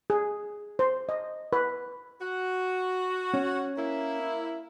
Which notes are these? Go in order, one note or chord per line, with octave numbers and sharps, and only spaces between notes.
G#4
C5
D#5
B4
F#4
C#4
A#3 E4